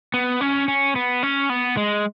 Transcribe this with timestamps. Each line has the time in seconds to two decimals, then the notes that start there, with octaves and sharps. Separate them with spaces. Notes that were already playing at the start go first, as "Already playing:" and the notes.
0.14 B3
0.41 C#4
0.68 C#4
0.96 B3
1.23 C#4
1.50 B3
1.77 G#3